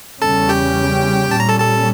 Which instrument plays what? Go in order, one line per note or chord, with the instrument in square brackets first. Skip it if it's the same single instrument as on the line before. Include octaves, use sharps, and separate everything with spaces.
[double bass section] E2 C#3 G3 C#4 [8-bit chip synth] A4 A5
[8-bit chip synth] G4 G5
[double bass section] A#2 G3 C#4 [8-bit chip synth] A5
[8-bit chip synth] A#5
A4 A5
A4 A5